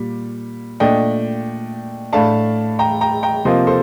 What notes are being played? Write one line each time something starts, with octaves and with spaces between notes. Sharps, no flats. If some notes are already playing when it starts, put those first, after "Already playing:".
Already playing: A#2 G3
A#2 A3 D4 D#5 G5
A2 A3 D4 F5 A5
G5 A#5
G5 A#5
G5 A#5
C3 F3 A#3 C5 D#5
A4 C5